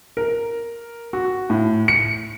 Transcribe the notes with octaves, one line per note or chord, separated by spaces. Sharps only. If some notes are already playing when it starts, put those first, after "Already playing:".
A#4
F#4
A2
C#7